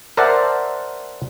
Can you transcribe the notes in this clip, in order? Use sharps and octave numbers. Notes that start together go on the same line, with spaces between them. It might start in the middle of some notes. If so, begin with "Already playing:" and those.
A#4 C5 D5 E5 F#5 A5